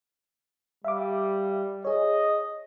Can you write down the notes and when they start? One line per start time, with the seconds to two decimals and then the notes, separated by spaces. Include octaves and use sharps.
0.85 G3 E5 F5 D6
1.85 G#4 C#5 D#5